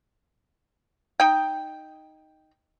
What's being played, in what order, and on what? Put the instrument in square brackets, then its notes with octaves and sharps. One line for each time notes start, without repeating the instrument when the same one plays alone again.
[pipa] D#4 G5